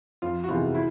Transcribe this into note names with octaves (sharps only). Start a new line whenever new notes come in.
F2 F4
F#4
C3 E3 G#3 B3 F4
E4